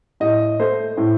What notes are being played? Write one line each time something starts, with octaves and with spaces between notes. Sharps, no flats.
A2 D#5
A3 C5
A2